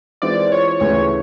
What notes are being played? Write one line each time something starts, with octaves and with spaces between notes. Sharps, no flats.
E3 G#3 C4 F4 D5
C#5
D2 C#3 E3 A3 C#4 C#5